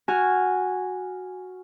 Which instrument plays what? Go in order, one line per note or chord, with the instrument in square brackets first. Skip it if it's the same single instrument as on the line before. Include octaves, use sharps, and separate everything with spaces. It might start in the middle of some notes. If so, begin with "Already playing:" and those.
[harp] F#4 G#5 F6